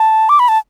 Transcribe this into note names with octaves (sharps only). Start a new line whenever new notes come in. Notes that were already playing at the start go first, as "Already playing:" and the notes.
Already playing: A5
D6
B5
A5